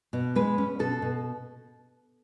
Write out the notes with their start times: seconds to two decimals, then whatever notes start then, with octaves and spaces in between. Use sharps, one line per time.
0.13 B2
0.35 G#3 B4
0.58 C#4
0.79 B2 A4
1.02 B2